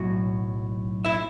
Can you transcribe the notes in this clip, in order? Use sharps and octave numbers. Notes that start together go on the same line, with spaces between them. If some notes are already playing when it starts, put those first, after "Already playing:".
Already playing: B1 A2 F#3 F#4
E4 E5